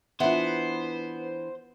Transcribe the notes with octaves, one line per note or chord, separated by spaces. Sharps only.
E3 B3 D4 F4 C5 E5